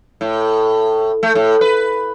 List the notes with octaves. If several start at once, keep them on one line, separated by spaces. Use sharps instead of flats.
A2
A3
A2
B4